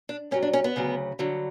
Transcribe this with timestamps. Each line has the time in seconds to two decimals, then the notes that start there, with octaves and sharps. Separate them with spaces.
0.09 D4
0.31 G2 F#3 C#4
0.43 D4
0.53 C#4
0.64 B3
0.76 D2 C#3 F#3
1.19 G2 D3 F#3